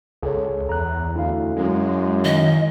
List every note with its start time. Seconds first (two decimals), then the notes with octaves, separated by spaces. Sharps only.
0.23 C#2 G#4 A4 C#5
0.69 E2 A#5 F#6
1.16 D2 E4 F5
1.56 F#2 G#3
2.25 D#3 D#5